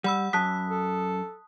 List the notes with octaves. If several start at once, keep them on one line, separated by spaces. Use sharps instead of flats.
G3 F#5 B5 E6
F#2 A5 D#6 F#6 B6
A4